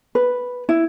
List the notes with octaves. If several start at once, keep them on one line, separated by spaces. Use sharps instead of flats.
B4
E4